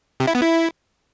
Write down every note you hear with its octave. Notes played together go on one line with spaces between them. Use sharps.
C3
E4
B3
E4